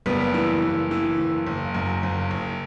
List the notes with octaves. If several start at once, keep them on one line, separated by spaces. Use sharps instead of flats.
F#1 G3 B3
E3
F#1
E3
F#1
F#1
F#2
F#1
F#1